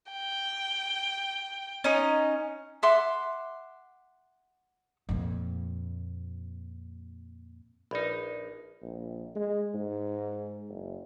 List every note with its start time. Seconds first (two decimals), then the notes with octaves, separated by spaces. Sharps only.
0.12 G5
1.84 C#4 D#4
2.83 E5 F#5 C6 D6
5.09 F2 A#2
7.91 A#1 D#4 B4 D5 B5
8.82 A#1
9.36 G#3
9.74 G#2
10.69 F#1